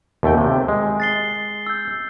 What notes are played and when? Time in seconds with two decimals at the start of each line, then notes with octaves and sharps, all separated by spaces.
0.23 D#2 A3 G5
0.38 C3
0.68 G#3
1.00 A6 C7 G7
1.67 E6 G6